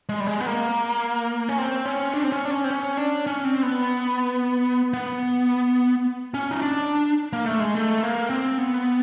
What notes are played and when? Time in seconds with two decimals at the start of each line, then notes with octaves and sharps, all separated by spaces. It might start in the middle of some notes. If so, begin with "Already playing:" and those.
0.09 G#3
0.20 G3
0.27 G#3
0.40 B3
0.47 A#3
1.49 C#4
1.58 C4
1.85 C#4
2.14 D4
2.24 C4
2.32 C#4
2.45 D4
2.51 C#4
2.64 C4
2.70 C#4
2.97 D4
3.27 C#4
3.44 C4
3.63 B3
4.94 B3
6.34 C#4
6.51 D#4
6.62 D4
7.33 A#3
7.46 A3
7.60 G#3
7.75 A3
8.03 A#3
8.30 C4
8.58 B3